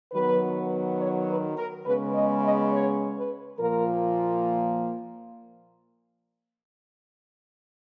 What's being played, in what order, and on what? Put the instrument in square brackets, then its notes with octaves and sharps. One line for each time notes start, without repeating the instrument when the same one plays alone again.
[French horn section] D#3 F#3 B3 B4
C#5
B4
A#4
C#3 G#3 B3 B4
D#5
D#5
C#5
B4
A#2 F3 A#3 A#4